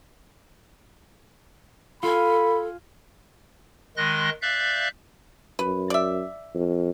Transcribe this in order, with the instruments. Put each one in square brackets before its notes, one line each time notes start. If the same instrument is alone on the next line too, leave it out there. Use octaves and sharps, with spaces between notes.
[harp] F4 G#5 [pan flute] A4 [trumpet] B5
[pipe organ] D#3 G#3 C6 F#6 A#6
D5 E5 F5 F#6 G6
[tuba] F#2 [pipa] B4
[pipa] D5 E5
[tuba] F2